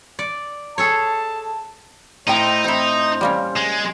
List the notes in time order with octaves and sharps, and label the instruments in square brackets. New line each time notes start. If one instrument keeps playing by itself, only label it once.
[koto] D5
[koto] G#4 A4 C#5 [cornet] A5
[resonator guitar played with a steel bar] A2 G5 [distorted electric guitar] D#4 [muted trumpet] C5
[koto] C4 E4
G3 A#3 C#4
[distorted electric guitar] G#3